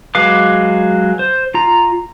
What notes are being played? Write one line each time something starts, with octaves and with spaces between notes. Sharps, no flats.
F#3 G#3 B4 F5 D6
C5
F4 A#5